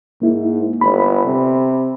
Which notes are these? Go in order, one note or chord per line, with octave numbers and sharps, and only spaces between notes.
G#2 A#3 E4
G1 B5
C3